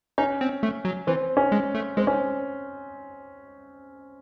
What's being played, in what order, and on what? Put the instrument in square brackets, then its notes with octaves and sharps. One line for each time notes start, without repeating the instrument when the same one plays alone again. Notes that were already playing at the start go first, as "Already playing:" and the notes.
[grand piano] C#4 [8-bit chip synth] D#4
[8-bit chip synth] C4
A3
F#3
[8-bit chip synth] E3 [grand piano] C4
[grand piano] C#4
[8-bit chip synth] G#3
A3
[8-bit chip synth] G#3 [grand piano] C4
[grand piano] C#4